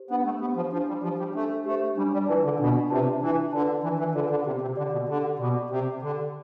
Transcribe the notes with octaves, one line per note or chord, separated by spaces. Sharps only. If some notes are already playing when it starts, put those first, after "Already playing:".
Already playing: G4 C5
B3 D4
A3
B3 G4 C5
F3
F3 D4
G3
F3 G4 C5
G3
A3 D4
A3 G4 C5
G3 D4
G3
E3 F4 B4 D5 A5
D3
B2 D4
C3 F4 B4 D5 A5
E3 D4
D3 F4 B4 D5 A5
E3 D4
E3
D3 F4 B4 D5 A5
D3
C3 G4
C3
D3 D5 G5 D6
B2
D3 G4
B2 D5 G5 D6
C3 G4
D3 D5 G5 D6